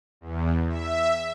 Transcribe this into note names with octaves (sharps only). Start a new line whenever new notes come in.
E2
E5